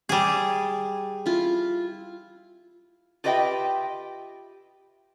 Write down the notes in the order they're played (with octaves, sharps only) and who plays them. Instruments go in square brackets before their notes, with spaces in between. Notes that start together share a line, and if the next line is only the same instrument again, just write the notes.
[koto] G3 G#4
[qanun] E4 F4
[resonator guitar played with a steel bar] F4 G4 B4 D#5 E5 G5